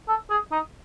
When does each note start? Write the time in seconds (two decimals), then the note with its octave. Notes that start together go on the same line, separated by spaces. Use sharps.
0.09 A4
0.30 G#4
0.52 D#4